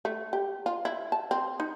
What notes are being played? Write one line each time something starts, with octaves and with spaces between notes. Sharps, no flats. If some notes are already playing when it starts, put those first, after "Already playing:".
A3
G4
F4
E4
A5
C4
D#4